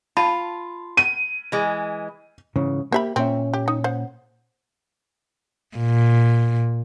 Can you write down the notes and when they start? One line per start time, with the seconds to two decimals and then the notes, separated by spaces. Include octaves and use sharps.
0.17 F4 A5 B5
0.97 D#7
1.52 E3 G#3
2.56 G#2 C#3 E3
2.92 A#3 G4 C5 E5 B5
3.16 A#2 C4 C#4 E5
3.54 G4
3.68 D#4
3.84 C5 F#5
5.77 A#2